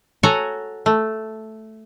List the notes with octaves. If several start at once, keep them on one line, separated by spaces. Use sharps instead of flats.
F#4 A4 C#5 G#5 A#5
A3